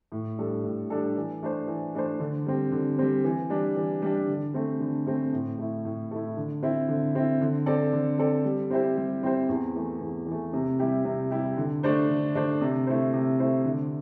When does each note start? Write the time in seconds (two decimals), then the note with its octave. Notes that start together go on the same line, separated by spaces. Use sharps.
0.12 A2
0.39 G3 D4 A4
0.64 A2
0.90 G3 D4 A4
1.17 E3
1.43 A3 D4 C5
1.68 E3
1.95 A3 D4 C5
2.20 D3
2.46 G3 C4
2.72 D3
2.99 G3 C4
3.25 E3
3.50 G3 D4
3.77 E3
4.02 G3 D4
4.28 D3
4.54 A3 C4
4.80 D3
5.07 A3 C4
5.33 A2
5.58 A3 E4
5.85 A2
6.11 A3 E4
6.37 D3
6.63 C4 E4
6.88 D3
7.15 C4 E4
7.41 D3
7.66 C4 A4 D5
7.93 D3
8.19 C4 A4 D5
8.45 G3
8.70 C4 E4 G4 C5
8.97 G3
9.23 C4 E4 G4 C5
9.49 E2
9.75 E3 A3
10.01 E2
10.27 E3 A3
10.53 C3
10.79 G3 E4 G4
11.05 C3
11.31 G3 E4 G4
11.57 D3
11.83 A3 D4 C5
12.09 D3
12.35 A3 D4 C5
12.61 C3
12.87 A3 E4 C5
13.14 C3
13.39 A3 E4 C5
13.64 D3